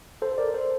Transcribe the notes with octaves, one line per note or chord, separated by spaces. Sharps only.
A4 C5
A#4 D5
A4 C5